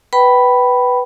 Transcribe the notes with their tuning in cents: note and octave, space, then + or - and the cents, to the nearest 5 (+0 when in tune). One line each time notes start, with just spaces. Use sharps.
B4 +0 G5 -25 B5 +0